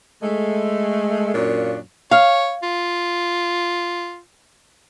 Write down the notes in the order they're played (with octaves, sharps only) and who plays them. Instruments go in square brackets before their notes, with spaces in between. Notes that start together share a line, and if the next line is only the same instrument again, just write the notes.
[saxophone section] G#3 A3
F#2 A#2 A#3 D4 C#5
[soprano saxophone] C#5 [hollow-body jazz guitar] F5
[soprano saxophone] F4